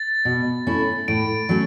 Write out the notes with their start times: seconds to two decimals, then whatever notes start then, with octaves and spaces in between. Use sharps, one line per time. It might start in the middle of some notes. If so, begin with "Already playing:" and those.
Already playing: A6
0.25 B2
0.67 A3 C#4 E4
1.08 A2 D7
1.49 F#3 A3 C#4